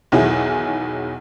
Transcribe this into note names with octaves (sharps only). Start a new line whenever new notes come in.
B1 E2 D#3 F#3 E4 G#4